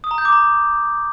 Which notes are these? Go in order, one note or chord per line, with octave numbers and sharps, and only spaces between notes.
D#6
A#5
G6
D6
A#5